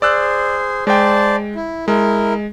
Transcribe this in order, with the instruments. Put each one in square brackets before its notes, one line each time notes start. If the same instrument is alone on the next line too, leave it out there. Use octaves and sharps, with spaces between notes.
[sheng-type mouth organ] G#4 C5 [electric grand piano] D5 E6 F#6
[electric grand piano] G#3 G5 [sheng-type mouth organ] C5 D5 A5
[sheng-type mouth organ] E4
[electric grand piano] G#3 [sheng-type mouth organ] E4 A#4